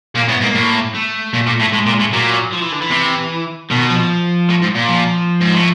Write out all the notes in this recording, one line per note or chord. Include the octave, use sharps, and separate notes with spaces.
A#2 A#3
A2 B3
G#2 A#3
A2
A3
A#2
A#2
A2
A3
A2 G#3
A#2
A2
A#2 F#3
F3
E3
D3
E3
C3
B2 D#3
F3
A2
G#2
A#2
F3
G#2
A2